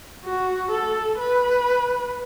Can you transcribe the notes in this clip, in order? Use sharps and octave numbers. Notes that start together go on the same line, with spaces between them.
F#4
A4
B4